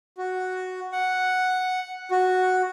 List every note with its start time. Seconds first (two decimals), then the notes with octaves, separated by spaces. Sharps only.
0.18 F#4
0.92 F#5
2.11 F#4